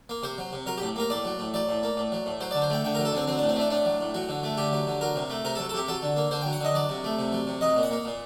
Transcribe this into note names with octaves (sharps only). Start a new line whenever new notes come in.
A#3
C3 C5
F#3
C3
F#3 A#4
A2 G4
A#3 A#4
A2 D5
F#3
A2
F#3 D5
A2
A#3
A2
F#3
A2
F#3 C5
D3 D5
C5
A3 G5
D3 G5
F#3 A#4
A4
D3 C4
F#3 C4
A2 D4
C4
A3 D4
A2 D4
F#3
A2
F#3 F#4
D3
A3
D3 G4
F#3
D3
F#3 A#4
C3
A3
C3 A#4
F#3 A4
A4
C3 G4
F#3 A4
D3
A#3
D3 C5
F#3 G5
F#5
D3 D#5
F#3 D5
C3
A3
C3
F#3
C3
F#3 D#5
A#2
F#5
A#3
A#2